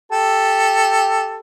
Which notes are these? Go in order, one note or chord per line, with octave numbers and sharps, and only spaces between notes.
G4 A4